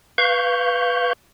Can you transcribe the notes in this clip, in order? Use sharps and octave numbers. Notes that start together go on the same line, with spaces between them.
B4 F5 C#6 G6